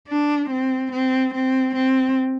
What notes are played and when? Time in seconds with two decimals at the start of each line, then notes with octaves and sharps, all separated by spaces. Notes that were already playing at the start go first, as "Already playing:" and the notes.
0.09 D4
0.50 C4
0.92 C4
1.35 C4
1.76 C4